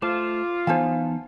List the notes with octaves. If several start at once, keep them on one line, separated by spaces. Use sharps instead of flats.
A3 F4 C5 A5 D6
E3 B3 D#4 C5 F5 G#5 A5